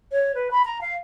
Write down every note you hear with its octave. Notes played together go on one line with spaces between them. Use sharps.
C#5
B4
B5
A#5
F5